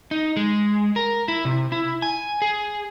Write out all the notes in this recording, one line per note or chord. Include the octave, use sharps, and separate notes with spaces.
D#4
G#3
A#4
E4
C3
E4
G#5
G#4